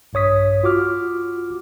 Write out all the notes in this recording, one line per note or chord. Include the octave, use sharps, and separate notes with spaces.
A#1 G2 C#5 D#6 B6
F4 F#4 D6 F6